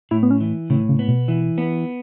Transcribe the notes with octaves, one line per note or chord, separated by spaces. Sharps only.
A2 E4
B3
C#4
E3
A2 C#3
C#3
B3
B2
E3
B3